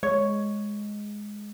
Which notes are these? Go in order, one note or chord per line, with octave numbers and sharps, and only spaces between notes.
G#3 C#5